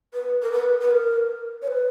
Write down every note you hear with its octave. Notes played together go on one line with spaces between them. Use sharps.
B4
A#4
B4
B4
A#4
C#5
B4